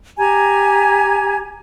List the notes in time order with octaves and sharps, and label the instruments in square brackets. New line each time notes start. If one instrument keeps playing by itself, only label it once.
[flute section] G4 G#5 A#5 G#6